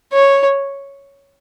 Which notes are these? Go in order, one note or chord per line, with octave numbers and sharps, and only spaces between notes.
C#5